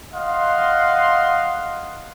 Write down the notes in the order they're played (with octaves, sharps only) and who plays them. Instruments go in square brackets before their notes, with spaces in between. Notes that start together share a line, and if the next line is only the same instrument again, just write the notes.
[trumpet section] D#5 F5 F#5 C6